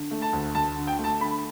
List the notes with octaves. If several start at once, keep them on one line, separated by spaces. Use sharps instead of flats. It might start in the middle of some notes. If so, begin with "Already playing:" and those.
Already playing: D3
A3
A5
D2
D2 A5
D3
G5
A3
A5
D3 B5